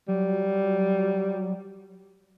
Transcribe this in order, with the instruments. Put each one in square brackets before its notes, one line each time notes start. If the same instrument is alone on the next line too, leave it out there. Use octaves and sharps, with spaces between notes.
[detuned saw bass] F#3 [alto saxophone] G3